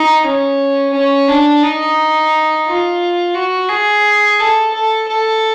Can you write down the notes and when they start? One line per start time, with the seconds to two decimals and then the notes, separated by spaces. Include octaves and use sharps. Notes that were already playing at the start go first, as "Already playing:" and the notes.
Already playing: D#4
0.25 C#4
0.93 C#4
1.28 D4
1.63 D#4
2.66 F4
3.34 F#4
3.69 G#4
4.39 A4
4.73 A4
5.08 A4